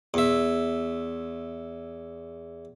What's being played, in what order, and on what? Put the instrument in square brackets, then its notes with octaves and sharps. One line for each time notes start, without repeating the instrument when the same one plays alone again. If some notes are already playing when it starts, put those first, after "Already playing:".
[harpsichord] E2 E5